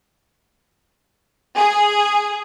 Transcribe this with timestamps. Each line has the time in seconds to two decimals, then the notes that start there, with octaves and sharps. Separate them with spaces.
1.57 G#4